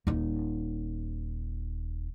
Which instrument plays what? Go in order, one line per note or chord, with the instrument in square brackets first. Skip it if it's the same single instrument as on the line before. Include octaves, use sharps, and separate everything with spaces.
[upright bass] D#1 D#4